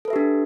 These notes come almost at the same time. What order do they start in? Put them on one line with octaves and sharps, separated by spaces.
A4 B4 E5 G4 D4